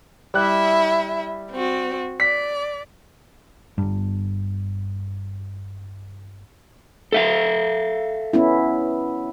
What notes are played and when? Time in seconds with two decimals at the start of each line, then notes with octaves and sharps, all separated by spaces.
0.34 G3 E4 E5 F#6
1.50 C4 F#4
2.20 D5 B6
3.78 G1 G2
7.12 A4 E5 F5
8.33 B3 C#4 E4